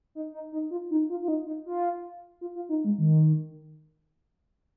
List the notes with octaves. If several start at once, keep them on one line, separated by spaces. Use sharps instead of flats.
D#4
D#4
D#4
F4
D#4
F4
F4
D#4
D#4
F4
F4
F4
D#4
G#3
D#3